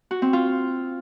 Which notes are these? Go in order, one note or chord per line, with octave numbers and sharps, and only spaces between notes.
F#4
C4
F4